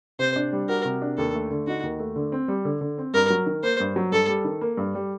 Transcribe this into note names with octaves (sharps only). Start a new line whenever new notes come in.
C3 C5
D4
G3
F#4 A#4
C3
D4
D#2 A4
A3
D3
D#4 F#4
D#2
A3
D3
C4
G3
D3
D3
C4
G2 A#4
F#3
D#3
A#3 C5
G2
F#3
G2 A4
G3
D#3
A#3
G2
G3